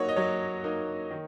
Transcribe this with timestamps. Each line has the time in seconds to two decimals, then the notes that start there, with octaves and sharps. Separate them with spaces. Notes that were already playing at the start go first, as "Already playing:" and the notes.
Already playing: F#3 A#3 D#4 C#5 F#5
0.09 D#5
0.16 F#3 C#5
0.64 A#3 D#4
1.11 D#3